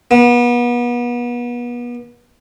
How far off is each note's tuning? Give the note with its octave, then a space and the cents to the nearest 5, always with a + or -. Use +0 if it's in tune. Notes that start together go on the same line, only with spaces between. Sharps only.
B3 -35